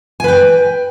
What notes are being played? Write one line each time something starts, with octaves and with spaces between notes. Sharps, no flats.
B4 G5 G#5